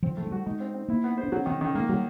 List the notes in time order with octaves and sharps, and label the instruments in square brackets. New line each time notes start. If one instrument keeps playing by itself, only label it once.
[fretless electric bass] F3 [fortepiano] C4
[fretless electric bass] F3 [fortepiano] A3
[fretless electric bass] G#3
[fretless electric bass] G3 [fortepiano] F#4
[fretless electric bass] G#3 [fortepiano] D#4
[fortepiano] C4
C4
[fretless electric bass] A#3 [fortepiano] E4
[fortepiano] B3
C5
[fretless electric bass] D4
[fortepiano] F#3 [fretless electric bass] C#4
[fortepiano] D#3 [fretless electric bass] C4
[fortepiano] D#3 [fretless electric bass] C#4
[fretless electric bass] G#3 [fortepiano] A#3
[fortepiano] F#3 [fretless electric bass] G3